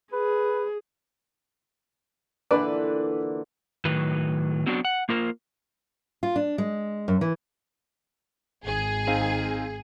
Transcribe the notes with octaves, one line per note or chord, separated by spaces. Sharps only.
G#4 B4
A#2 D3 E3 D4 B4 D5
A2 D#3 F#3 B4
F#3 B3 C4 D4 F#4
F#5
A#3 F4 A#4 C5
F4
D4
G#3
F#2
E3
G#1 G#4
C4 D#4 F5